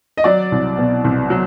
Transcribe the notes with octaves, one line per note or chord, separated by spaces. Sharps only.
D#5
F#3 D5
C2
B2
C2
F#3